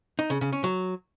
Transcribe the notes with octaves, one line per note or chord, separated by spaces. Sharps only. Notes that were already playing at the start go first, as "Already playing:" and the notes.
D#4
C#3
C#3
C#4
F#3